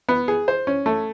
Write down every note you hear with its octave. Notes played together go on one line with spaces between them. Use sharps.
B3
G#4
C5
C#4
A3